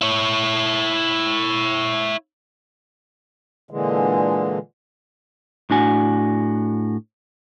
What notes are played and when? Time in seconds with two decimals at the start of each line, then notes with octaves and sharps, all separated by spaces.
0.01 E4 C#5
3.71 A#2 D3 E3 G#3
5.70 A2 D4 F#4 G#5